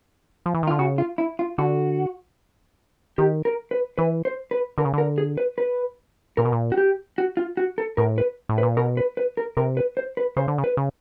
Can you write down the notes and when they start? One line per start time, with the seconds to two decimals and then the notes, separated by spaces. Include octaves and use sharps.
0.46 F3
0.55 E3
0.63 D#3
0.67 D3 F4
0.79 C#3 F#4
0.98 F4
1.18 E4
1.39 F4
1.58 D3 F#4
3.18 D#3 G4
3.45 A#4
3.71 B4
3.98 E3 B4
4.25 C5
4.51 B4
4.78 D3 A#4
4.85 C#3
4.93 D3 A#4
5.18 G#4
5.38 B4
5.58 B4
6.37 A#2 A#4
6.45 B2
6.52 A#2
6.72 F#4
6.78 G4
7.18 F#4
7.37 F4
7.57 F#4
7.78 A4
7.97 A2 A#4
8.18 B4
8.49 A2
8.58 B4
8.63 A#2
8.77 B2 A#4
8.97 B4
9.17 B4
9.37 A#4
9.57 C3 A#4
9.77 B4
9.97 C5
10.17 B4
10.37 C#3 C5
10.48 D3
10.58 C#3
10.64 B4
10.77 C#3